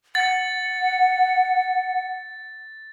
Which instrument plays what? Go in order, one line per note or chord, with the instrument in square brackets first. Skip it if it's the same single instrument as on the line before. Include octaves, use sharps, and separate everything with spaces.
[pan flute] F#5 [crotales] A6